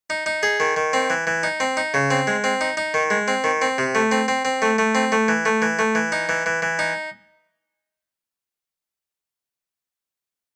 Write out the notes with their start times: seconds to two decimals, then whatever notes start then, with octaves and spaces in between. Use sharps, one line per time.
0.10 D#4
0.26 D#4
0.43 G#4
0.60 D#3
0.76 D#3
0.93 C4
1.10 E3
1.27 E3
1.43 D#4
1.60 C4
1.77 D#4
1.94 C#3
2.10 C4
2.27 G#3
2.44 C4
2.61 D#4
2.77 D#4
2.94 D#3
3.10 G#3
3.28 C4
3.44 D#3
3.62 C4
3.78 C3
3.95 A3
4.11 C4
4.28 C4
4.45 C4
4.62 A3
4.78 A3
4.95 C4
5.12 A3
5.28 E3
5.45 A3
5.62 E3
5.79 A3
5.95 E3
6.12 D#4
6.29 E3
6.46 E3
6.62 E3
6.79 D#4